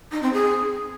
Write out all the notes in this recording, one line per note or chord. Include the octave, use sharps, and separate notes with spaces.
D#4
C4
G#4